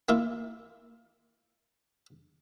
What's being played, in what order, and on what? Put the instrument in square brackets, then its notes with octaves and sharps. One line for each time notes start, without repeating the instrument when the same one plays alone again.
[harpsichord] A#3 E4 F4